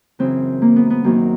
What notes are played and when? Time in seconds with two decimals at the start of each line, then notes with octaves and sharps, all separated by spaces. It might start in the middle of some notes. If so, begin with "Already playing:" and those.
0.19 F#2 C#3 E3 C4
0.62 A#3
0.76 B3
0.90 B3
1.04 F#2 D#3 F#3 A#3